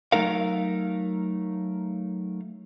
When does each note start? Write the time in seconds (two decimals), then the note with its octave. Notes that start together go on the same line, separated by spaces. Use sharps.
0.12 F#3 A3 D#4 A#4 F5